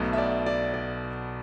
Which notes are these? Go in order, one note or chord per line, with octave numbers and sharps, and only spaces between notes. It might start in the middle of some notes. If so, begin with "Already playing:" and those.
Already playing: B1 B2 A3
E5
D5
D5
D5